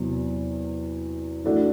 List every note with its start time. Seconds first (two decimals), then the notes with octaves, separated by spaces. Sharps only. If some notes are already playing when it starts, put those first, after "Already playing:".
Already playing: E2 C3 F#3 B3
1.44 E3 A3 D4 F#4